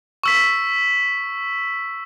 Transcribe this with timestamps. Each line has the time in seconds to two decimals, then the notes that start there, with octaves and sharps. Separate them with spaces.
0.24 C#6 E6 B6